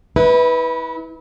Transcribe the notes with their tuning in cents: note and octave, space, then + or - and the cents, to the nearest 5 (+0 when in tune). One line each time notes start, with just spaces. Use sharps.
E4 -35 B4 -5